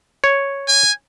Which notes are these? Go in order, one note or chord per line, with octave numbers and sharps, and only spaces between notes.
C#5
G#5